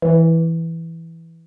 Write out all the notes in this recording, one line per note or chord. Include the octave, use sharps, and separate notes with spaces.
E3